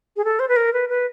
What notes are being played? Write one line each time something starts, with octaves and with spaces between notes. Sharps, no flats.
G#4
A4
C5
B4
A#4
B4
B4